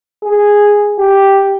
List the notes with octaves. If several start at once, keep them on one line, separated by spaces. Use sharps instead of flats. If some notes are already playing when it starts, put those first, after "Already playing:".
G#4
G4